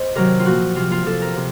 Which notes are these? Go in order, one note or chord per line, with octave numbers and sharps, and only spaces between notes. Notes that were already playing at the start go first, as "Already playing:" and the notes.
Already playing: C5 D#5
C3 D#3 F#3 A#4
F4
A#2 F3 F#4
C3 F3 F4
F4
C3 F3 A4
A#4
C3